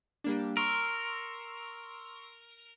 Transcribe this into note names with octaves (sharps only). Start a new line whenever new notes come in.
G3 A#3 D4
A#4 C6 C#6 E6